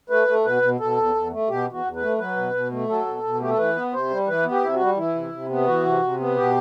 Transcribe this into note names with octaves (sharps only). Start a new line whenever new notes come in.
A3 B4
A3
B2 B4
B2
B2 A4
E2
E2
A3
B2 G4
E2 F#4
E2
B4
A3
F#3 B4
B2
B2
A3
F#3 A4
B2
B2
A3 G4
A4
E3 B4
B3
C3 C5
G3
E3 B4
B3
G4
C3 E4
F#4
G3
E3 E4
C3
C3
B3
E3 F#4
C3
C3
B3
B2 G4